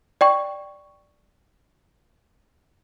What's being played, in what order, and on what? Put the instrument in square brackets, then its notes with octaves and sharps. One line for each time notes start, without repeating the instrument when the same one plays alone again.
[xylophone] D5 G5 C#6